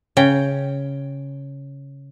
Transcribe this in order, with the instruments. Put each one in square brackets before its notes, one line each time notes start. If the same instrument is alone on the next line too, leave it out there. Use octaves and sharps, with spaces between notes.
[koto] C#3 G5